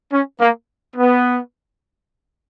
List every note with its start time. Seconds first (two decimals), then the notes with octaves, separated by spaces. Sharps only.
0.12 C#4
0.40 A#3
0.96 B3